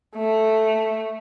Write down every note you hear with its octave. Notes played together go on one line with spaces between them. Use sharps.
A3